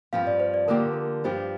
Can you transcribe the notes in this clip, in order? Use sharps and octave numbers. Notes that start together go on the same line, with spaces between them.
G2 F3 C4 F5
D5
C5
D5
D3 F3 A#3 G4 A#4
A#4
G2 F3 D4 G4 C5